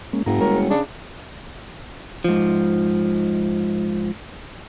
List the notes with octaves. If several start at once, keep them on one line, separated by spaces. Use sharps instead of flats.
G#3 A#3 C#4
F#1 G#2 A#5
G3 G#3 A#4 C#5
C#3 D4
G#2 F3